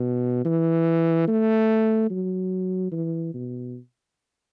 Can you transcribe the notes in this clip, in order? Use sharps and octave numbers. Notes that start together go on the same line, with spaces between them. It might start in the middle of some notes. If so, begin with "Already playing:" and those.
Already playing: B2
E3
A3
F#3
E3
B2